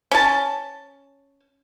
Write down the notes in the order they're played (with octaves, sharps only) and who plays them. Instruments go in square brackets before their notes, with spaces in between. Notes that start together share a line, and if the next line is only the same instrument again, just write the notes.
[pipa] C#4 A5